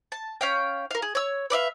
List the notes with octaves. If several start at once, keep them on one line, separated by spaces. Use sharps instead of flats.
A5
C#4 F5 G5
A#4 F5
G#4
C#5 E6
B4 D5 E5 F5